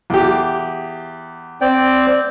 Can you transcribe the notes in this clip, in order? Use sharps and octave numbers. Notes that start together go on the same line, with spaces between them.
E2 G4
C4 D5 G5